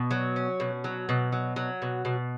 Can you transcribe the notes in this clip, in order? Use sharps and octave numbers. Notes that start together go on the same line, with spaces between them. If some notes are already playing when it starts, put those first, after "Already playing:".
Already playing: B2
F#3
C#4
B2
F#3
B2
F#3
F#3
B2
B2